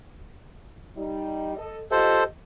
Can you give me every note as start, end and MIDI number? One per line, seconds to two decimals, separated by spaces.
0.97 1.56 55
0.97 1.56 63
1.57 1.79 69
1.57 1.79 75
1.91 2.24 65
1.91 2.24 67
1.91 2.24 69
1.91 2.24 72
1.91 2.24 75